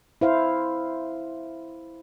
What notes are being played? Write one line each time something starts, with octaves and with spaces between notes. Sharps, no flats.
E4 C5 F5